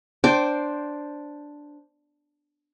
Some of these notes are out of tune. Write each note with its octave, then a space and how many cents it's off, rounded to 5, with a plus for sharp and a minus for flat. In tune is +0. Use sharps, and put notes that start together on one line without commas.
D4 +0 C5 +5 G5 -15